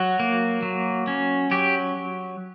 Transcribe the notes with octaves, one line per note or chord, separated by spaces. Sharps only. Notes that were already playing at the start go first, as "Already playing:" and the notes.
Already playing: F#3 F#4
A#3
F#3
C#4
F#3 G4